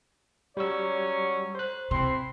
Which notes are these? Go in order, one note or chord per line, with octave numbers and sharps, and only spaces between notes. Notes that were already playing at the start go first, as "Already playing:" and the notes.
F#3 G3 C#4 C#5 E6
C5 F#6
C3 C4 E4 C6